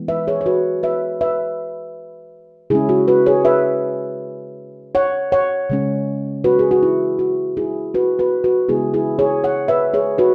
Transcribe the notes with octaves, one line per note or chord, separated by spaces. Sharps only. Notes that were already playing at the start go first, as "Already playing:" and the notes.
Already playing: E3 G#3 B3
B4 E5
G#4 C#5
C#5
F#4 B4
B4 E5
B4 E5
C#3 G#3 C#4 E4 G#4
F#4
F#4 B4
G#4 C#5
B4 E5
C#5 F#5
C#5 F#5
C#3 G#3 C#4
F#4 B4
G#4
F#4
E4
F#4
E4 G#4
F#4 B4
F#4 B4
F#4 B4
C#3 G#3 B3 E4 G#4
E4 G#4
G#4 C#5
C#5 F#5
B4 E5
G#4 C#5
F#4 B4